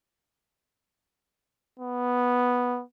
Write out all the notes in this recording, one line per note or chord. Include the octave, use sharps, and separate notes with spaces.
B3